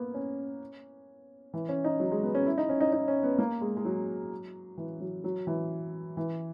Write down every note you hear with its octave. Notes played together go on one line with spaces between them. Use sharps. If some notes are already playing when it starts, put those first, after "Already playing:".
Already playing: A#3 B3
C#4
E3
C#4
D#4
F#3
G#3
B3
C#4
E4
D#4
C#4
D#4
D#4
C#4
B3
A#3
G#3
G#3
F#3
E3
F#3
F#3
E3
E3